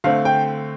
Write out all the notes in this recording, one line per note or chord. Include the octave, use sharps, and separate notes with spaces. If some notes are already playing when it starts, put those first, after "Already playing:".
D3 A3 C4 F5
G5